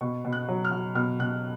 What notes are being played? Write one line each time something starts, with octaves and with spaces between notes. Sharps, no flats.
B2 C#6
B2
F#6
F#3
F6
F#3
B2 F6
B2 F#6